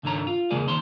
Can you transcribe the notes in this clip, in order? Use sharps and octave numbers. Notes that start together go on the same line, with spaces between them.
C#2 G#2 D3 D#3 C#5 A#5
F4
E2 C#3 G#3 A#3 G#4 D5
D#2 D#3 C5 C6